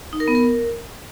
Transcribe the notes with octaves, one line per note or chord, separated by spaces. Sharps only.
D#4
A#4
B3
A#4